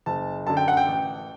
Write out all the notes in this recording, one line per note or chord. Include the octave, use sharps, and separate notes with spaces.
F#1 A5
F#2 D3 A5
G5
F#5
G5
A1